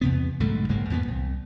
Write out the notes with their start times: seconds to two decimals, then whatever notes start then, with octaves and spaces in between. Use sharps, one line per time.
0.01 E2 C3 B3
0.40 B1 G#2 D3 A3
0.69 F#1 G#2 G#3 A#3
0.90 E2 A#2 A#3 B3
1.08 C2